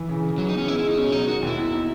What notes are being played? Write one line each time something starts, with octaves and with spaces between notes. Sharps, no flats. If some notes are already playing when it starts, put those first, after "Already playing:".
Already playing: E3
C#3
C#3
E3 F#3
D#4
B3 C#4
G#3 E4
E4
G#3 D#4
B2 C#4
F#3 D#4
D#3 F#4
D#2 E4
B2
D#4